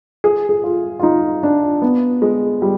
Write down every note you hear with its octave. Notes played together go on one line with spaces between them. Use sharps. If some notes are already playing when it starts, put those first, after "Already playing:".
G#4
G#4
F4
F4
D#4
D4
B3
G#3
G3